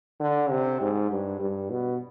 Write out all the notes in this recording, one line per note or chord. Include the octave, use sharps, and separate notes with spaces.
D3
C3
G#2
G2
G2
B2